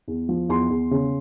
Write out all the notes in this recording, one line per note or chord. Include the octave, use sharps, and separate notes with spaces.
E2
F3
E2 C6
E2
C#3